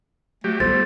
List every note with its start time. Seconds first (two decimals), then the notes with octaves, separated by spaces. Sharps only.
0.44 F#3 A3 G4
0.60 G3 A3 B3 F4 C5 A6